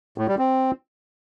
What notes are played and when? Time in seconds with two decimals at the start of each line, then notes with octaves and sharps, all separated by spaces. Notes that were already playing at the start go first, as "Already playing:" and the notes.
0.18 A2
0.28 G3
0.39 C4